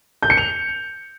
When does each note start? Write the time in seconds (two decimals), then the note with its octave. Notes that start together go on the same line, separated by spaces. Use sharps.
0.23 G6
0.30 C#7
0.37 F7